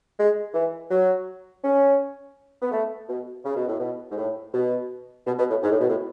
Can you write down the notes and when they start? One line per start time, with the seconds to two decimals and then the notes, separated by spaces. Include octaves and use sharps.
0.18 G#3
0.54 E3
0.91 F#3
1.63 C#4
2.62 B3
2.72 A3
3.08 B2
3.44 C#3
3.56 B2
3.67 A2
3.79 B2
4.11 G#2
4.17 A2
4.53 B2
5.26 B2
5.39 B2
5.50 A2
5.63 G#2
5.71 A2
5.80 B2
5.90 A2